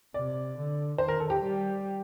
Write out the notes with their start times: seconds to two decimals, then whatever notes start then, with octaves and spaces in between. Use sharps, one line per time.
0.14 C3 D5
0.57 D3
0.98 D#3 C5
1.08 A#4
1.20 A4
1.30 G4
1.40 G3